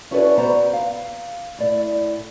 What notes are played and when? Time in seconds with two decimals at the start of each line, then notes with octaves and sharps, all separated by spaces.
0.11 C#4 E4 F#4 A4 B4 D5
0.38 B3 F#4 C5 D5 A#5
0.73 F5
1.59 A2 D5